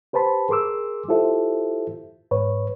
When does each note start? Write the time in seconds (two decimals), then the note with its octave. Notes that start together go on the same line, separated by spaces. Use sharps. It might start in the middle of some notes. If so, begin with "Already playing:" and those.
0.13 G4 B4 C5 A5 B5 C6
0.49 G#4 A#4 C6 D6 E6
1.09 E4 F4 G4 A4 C5 E5
2.31 G#2 B4 C#5